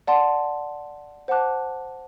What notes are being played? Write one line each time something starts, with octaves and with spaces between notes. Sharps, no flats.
D5 F#5 A5 C6
C5 F#5 A5 D6 F#6